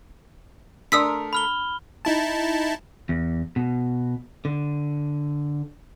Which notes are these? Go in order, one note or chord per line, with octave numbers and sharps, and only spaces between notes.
A3 D4 A#4 D5 C6 D#6 E6 B6
B5 F6 G7
D#4 E4 A5
E2
B2
D3